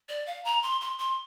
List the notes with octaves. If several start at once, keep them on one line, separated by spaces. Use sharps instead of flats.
D5
F5
A#5
C6
C6
C6